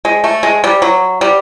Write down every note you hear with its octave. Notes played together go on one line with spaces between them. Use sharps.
G#3
A3
G#3
G3
F#3
G3